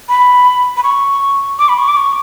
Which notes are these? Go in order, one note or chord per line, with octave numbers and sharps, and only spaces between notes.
B5
B5
C#6
D6
B5
C#6
D6
C#6